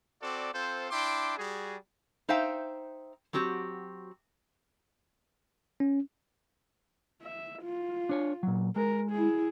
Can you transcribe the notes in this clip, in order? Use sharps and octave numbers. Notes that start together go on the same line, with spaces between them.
C4 F#4 A4 D5
C4 F4 A4 C5
D4 E4 G5 C6 D6
G3 F#4 G#4
D#4 C5 E5 F5 G5
F#3 C4 F#4 G4
C#4
E5
F4
D4 C#5
A#2 F#3
G#3 A#4
E4 G#4